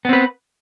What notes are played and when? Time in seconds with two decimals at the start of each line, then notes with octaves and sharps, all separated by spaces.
0.05 B3
0.09 C4
0.13 B4